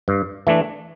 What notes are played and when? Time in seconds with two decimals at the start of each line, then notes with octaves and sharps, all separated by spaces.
0.08 G2
0.47 E3 A3 D4